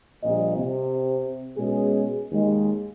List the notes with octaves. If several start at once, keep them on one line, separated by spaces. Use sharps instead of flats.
A#1 A#2 G3 C4 D#5
C3
B2 G#3 C#4 G#4
D#2 G#3